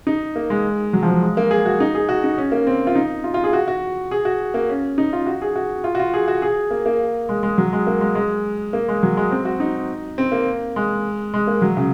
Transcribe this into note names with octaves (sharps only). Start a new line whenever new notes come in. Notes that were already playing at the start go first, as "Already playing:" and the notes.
D#4
A#3
G#3
F#3
F3
F#3
G#3
A#3
G#4
F#4
D#4
G#4
F#4
D#4
C#4
A#3
C4
F4
D#4
F4
F4
G#4
F#4
F#4
G#4
F#4
A#3
C#4
D#4
F4
F#4
G#4
F#4
F4
F#4
F4
G#4
F#4
G#4
A#3
A#3
G#3
G#3
F#3
G#3
A#3
G#3
G#3
A#3
G#3
F#3
G#3
C4
F#4
D#4
C4
A#3
G#3
G#3
A#3
F#3
C#3